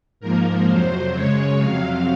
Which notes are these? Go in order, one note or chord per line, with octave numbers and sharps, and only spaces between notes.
G#2 F3 A#3 A#4
F2 C3 F#3 C5
F#2 C#3 G#3 C#5
F2 C3 F#3 F5